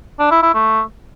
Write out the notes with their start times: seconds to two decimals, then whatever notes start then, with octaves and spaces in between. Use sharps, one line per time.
0.19 D4
0.31 E4
0.43 E4
0.54 A3